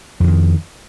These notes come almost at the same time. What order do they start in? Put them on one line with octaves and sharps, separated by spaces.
F2 D3 D#3